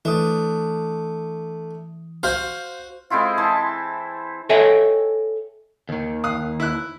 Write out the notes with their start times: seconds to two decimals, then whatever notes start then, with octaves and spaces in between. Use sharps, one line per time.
0.05 E3 A3 D4 D#6
2.23 F#4 C5 F5 F6 G6
3.10 G#3 C4 E4 F4
3.38 E3 A5
4.49 A4 C#5 D#5 E5 G5 G#5
5.89 D#2 D#3
6.24 F5 D#6 F#6
6.60 E4 F#6